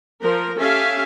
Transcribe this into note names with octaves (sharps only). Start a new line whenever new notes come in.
F3 A#4
C#4 G4 A4 E5 F5 G#5